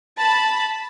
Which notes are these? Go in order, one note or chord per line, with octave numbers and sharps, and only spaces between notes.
A5 B5